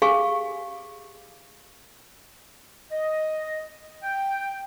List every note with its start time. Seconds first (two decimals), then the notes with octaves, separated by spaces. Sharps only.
0.02 G4 G#4 F5 F#5 G#5 C#6
2.91 D#5
4.03 G5